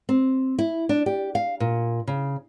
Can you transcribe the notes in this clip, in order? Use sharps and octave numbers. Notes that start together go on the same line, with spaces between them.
C4
E4
D4
G4
F5
A#2
C#3